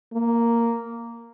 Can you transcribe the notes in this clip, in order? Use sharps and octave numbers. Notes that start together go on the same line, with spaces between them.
A#3